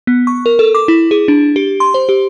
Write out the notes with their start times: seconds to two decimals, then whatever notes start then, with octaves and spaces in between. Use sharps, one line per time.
0.07 B3
0.27 C#6
0.46 A#4
0.59 A4
0.75 D6
0.88 E4
1.11 G#4
1.28 D4
1.56 G4
1.80 C6
1.94 C5
2.09 G4